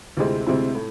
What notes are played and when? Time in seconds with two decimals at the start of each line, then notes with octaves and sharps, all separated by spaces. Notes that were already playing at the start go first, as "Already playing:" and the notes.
0.17 D2 C3 G#3 C4 E4
0.47 D2 C3 G#3 C4 E4
0.75 A2